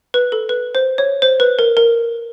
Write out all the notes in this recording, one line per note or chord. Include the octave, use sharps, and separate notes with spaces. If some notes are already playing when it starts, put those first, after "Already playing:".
B4
A4
B4
C5
C#5
C5
B4
A#4
A#4